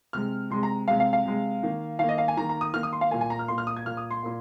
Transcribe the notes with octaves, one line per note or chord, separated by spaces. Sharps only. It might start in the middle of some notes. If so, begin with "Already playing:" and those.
C3 G#3 F6
C3 G#3 C6
A#5
C3 G#3 F5
F5
F5
C3 G#3
D#3 A#3
D#3 A#3 F5
D#5
F5
G#5
D#3 A#3 A#5
A#5
D#6
D#3 A#3 F6
D#6
C6
F5
A#2 A#3 G#5
G#5
A#5
F6
A#2 A#3 C6
F6
D#6
G#6
A#2 A#3 F6
D#6
C6
A#2 A#3